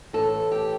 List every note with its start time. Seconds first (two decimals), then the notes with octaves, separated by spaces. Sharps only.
0.13 A2 E3 A4
0.52 G4